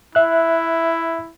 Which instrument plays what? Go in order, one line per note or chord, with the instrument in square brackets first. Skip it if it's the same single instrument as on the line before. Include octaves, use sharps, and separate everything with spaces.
[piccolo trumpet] E4 [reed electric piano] E5 F#6